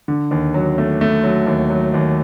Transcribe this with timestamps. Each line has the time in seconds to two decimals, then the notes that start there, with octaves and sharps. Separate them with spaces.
0.08 D3
0.31 D#2
0.54 F#3
0.78 A3
1.01 A3
1.23 F#3
1.47 D#2
1.70 F#3
1.94 D#2